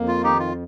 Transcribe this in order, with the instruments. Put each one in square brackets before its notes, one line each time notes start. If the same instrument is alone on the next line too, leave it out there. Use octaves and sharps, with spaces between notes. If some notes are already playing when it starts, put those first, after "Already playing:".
Already playing: [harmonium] F2 A#3
[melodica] F4
[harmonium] D#3 [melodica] D#4 G4
[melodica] F4